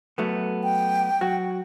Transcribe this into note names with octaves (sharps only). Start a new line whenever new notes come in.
F#3 A3 B3
G5
F#3 F#4